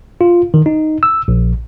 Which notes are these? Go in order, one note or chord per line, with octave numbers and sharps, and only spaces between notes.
F4
D#3
D#4
E6
A#1